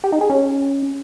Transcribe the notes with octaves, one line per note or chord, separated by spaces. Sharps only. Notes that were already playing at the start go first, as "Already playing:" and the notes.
G4
D#4
G#4
C#4